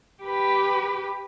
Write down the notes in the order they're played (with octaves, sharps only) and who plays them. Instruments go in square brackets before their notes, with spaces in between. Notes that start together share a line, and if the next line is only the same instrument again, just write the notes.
[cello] G4 B4